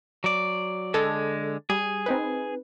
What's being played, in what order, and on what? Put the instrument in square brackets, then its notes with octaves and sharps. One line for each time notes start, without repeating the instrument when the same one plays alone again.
[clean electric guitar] F#3 D5
[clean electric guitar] D3 G#3 [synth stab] A4
[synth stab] G3 [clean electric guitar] G#4
[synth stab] C4 D#4 B4